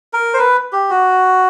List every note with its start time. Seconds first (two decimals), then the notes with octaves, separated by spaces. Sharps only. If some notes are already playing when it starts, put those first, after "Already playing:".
0.13 A#4
0.34 C5
0.38 B4
0.73 G4
0.90 F#4